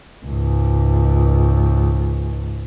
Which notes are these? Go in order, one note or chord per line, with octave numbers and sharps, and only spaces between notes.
C#2 G#2